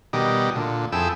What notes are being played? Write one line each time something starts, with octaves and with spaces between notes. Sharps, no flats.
B2 D#3 G3 G4 D#5
A#2 D3
F2 E4 G#4 A4 G5 E6